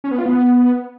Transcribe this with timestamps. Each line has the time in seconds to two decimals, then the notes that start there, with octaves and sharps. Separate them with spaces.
0.04 C#4
0.11 B3
0.18 F4
0.26 B3